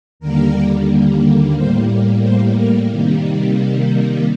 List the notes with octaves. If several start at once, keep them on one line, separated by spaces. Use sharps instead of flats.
D#2 D3 G3 A#3 A#4
A2 G3 A#3 C5
C5
A#4
C3 D#3 G3 A#3